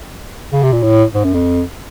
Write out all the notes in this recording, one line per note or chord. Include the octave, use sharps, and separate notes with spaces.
C#3
C3
A#2
A2
G#2
F#2
F2